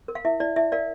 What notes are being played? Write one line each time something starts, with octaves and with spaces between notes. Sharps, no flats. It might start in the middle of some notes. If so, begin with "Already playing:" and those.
A#4
F5
E4 E5
E4 D5
E4 E5
A#4 D5 F5